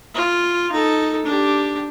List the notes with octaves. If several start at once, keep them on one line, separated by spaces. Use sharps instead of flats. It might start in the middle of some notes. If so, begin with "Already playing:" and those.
F4
D#4 A4
D4 G4